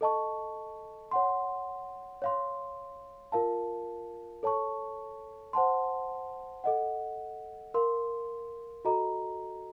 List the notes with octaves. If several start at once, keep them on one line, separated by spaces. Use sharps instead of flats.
A4 D#5 A5 C#6
C#5 F#5 C6
C#5 F5 C6
F4 A#4 F5 A5
A4 C#5 A5 C#6
C5 F#5 A5 C6
A4 D#5 F#5
A#4 F5 C6
F#4 A4 D#5 A#5